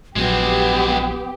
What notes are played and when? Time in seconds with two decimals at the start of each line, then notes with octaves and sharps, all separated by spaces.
0.16 A#1 F#3 G#3 B3 C4 G4